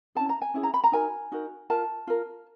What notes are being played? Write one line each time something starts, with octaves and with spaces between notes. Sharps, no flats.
C#4 E4 G#4 A5
A#5
G#5
C#4 E4 G#4
A#5
B5
A#5
D#4 F#4 A#4 G#5
D#4 F#4 A#4
F4 A#4 A5
F4 A#4